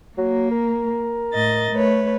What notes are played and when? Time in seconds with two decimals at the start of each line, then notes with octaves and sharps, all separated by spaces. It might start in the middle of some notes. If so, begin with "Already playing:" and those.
0.18 F#3 A#3
0.51 A#4
1.34 A2 D#5 A6
1.72 A3 B4 C#5